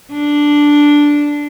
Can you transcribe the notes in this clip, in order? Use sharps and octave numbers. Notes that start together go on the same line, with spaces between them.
D4